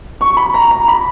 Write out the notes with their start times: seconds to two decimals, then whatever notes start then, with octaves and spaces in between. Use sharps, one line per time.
0.21 C#6
0.37 B5
0.54 A#5
0.71 A#5
0.88 B5